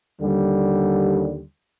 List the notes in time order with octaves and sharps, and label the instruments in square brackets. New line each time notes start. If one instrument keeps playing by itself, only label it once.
[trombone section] D#2 D3 G3